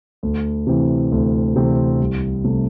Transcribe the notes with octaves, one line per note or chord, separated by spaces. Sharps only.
D2
C3 E3 C4
D2
C3 E3 C4
C2
C3 A3